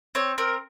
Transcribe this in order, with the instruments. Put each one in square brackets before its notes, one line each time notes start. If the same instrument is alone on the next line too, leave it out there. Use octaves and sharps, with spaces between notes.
[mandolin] C4 C#5
C4 A#4